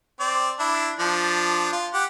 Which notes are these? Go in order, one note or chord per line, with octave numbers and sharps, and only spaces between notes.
C4 D5
D4 E4
F3 D4
F4
G4 F#5